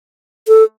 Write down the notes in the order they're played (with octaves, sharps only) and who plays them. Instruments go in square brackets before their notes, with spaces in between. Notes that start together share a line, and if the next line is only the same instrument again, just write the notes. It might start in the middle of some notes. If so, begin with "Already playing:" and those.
[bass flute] A4